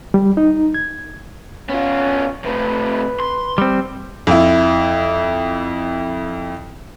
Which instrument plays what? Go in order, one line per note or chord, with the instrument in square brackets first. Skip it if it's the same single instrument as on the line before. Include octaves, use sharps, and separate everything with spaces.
[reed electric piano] G3
D#4
G#6
[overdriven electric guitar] B3 F4 [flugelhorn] C#4
[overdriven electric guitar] C3 A3 [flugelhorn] B4
[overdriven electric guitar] C6
[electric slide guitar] G3 C4
[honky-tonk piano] F2 E4